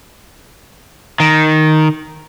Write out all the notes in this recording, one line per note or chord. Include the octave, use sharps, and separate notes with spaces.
D#3